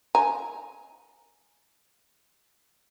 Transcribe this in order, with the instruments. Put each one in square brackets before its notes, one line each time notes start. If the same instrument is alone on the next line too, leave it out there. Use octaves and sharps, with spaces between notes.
[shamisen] G#5 A#5